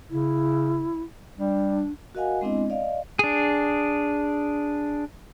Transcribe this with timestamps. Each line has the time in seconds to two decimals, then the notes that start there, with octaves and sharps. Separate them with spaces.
0.10 C#3 E4
1.38 G3 D4
2.15 F#4 A#4 D#5 F5 F#5 G#5
2.41 G#3 B3 C4 D4 E4 D#5
2.70 D5 D#5 F5
3.19 D4 G#4